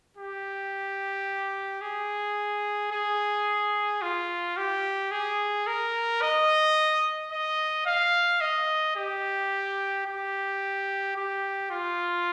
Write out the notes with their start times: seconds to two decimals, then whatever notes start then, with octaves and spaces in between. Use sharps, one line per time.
0.17 G4
1.81 G#4
2.92 G#4
4.02 F4
4.57 G4
5.11 G#4
5.67 A#4
6.22 D#5
7.32 D#5
7.86 F5
8.41 D#5
8.96 G4
10.06 G4
11.16 G4
11.71 F4